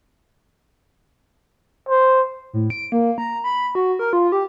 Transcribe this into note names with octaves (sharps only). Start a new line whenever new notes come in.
C5
A2
D7
A#3
A#5
B5
F#4
A#4
F4
G4